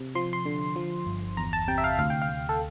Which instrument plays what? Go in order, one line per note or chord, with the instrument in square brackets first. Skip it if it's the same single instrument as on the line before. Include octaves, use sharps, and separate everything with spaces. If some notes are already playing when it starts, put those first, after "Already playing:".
Already playing: [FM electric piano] C3
F3 C6
C6
D3
F3
G1
E2 A#5
A5
C3 G5
E5
F5
D2 F5
G5
F5
D2
A4